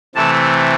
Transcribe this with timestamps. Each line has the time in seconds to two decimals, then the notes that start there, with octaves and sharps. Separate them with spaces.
0.15 C3 E3 A3 C4 A5